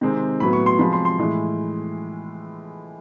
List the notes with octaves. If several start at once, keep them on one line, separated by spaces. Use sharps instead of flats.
C3 D#3 G#3 C4
A2 F#3 B3 B5
C#6
C6
C3 F3 G#3 B5
C6
C6
A2 E3 G#3